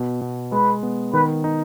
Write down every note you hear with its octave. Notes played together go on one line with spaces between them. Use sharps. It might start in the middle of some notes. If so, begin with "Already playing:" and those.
Already playing: B2
B2
G#3 B4
B3
D#3 B4
D#4